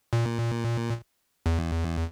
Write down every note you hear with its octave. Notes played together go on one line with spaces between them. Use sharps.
A#2
E2